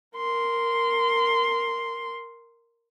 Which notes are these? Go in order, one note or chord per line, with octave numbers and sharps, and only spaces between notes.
A#4 C6